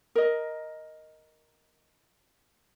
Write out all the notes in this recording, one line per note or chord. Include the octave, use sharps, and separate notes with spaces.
A#4 D#5